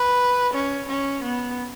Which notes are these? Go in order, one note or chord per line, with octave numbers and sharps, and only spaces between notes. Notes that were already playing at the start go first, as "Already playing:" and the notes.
Already playing: B4
C#4
C#4
B3